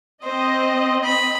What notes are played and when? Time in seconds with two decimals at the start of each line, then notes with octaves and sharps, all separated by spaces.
0.25 C4 C5 D#5
1.04 B5